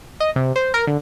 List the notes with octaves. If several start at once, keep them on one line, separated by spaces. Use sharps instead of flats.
D#5
C3
C5
A#4
D3